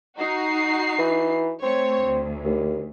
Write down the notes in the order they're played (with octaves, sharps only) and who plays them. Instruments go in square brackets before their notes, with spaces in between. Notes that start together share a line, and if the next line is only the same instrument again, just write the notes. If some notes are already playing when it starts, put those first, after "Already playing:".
[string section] D#4 F#4 C7
[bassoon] E3
[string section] A3 C#5 [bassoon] C4
[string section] D2
[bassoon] D#2